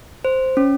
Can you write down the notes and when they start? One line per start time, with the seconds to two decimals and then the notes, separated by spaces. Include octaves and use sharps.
0.25 C5
0.57 C#4